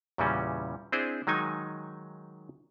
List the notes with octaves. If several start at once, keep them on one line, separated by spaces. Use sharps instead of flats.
E2 A#2 C#3 E3 G3 C#4
C4 D4 E4 G#4 C5
D#3 F#3 G#3 D#4 G#5